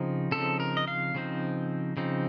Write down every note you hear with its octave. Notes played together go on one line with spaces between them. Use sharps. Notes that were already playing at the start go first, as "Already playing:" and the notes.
Already playing: C#3 F3 C4 D#4
C#3 F3 C4 D#4 A4
A#4
D#5
F5
C#3 F3 C4 D#4
C#3 F3 C4 D#4